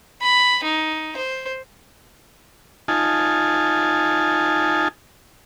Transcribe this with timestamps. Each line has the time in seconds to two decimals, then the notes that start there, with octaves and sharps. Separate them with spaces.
0.22 B5
0.63 D#4
1.16 C5
2.88 D#4 F4 G#5 A5